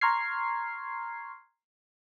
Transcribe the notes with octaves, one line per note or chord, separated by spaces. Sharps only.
A#5 C6 C#6 F6 G#6 C7